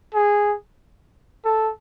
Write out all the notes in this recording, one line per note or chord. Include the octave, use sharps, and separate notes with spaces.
G#4
A4